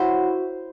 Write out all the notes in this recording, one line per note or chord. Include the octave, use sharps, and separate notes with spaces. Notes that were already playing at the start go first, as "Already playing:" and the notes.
Already playing: F#3 E4 F#4 C5